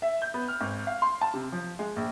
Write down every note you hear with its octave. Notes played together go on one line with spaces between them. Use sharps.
E5
G6
B3
F6
G#1
F5
C6
A5
C3
F3
G#3
A#1